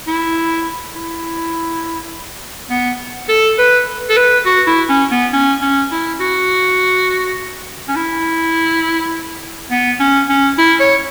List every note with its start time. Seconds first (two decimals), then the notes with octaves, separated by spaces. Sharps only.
0.08 E4
0.95 E4
2.70 B3
3.29 A4
3.58 B4
4.10 A4
4.17 B4
4.46 F#4
4.67 E4
4.89 C#4
5.11 B3
5.33 C#4
5.62 C#4
5.92 E4
6.20 F#4
7.88 C#4
7.95 E4
9.71 B3
9.99 C#4
10.29 C#4
10.58 E4
10.80 C#5